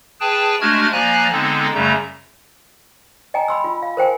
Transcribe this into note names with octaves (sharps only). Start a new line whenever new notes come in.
G#4 B4 G5 A5
G#3 A3 D4 F#4 F6 G#6
F3 A#3 D5 G#5 A#5 F#6
D3 G#3 B3 C4 D#4 A4
F#2 C#3 G3 A3 A#5
D#5 G5 G#5 A#5
B5 C6 E6
F4
F5
A#4 C5 G5 G#5